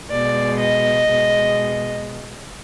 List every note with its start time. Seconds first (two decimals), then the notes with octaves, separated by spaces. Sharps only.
0.11 B2 G#3 D5
0.59 D#5
1.09 B2 G#3